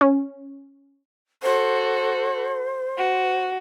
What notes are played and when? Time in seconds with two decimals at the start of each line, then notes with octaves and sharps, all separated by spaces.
0.01 C#4
1.43 F#4 A4 C5
2.97 F#4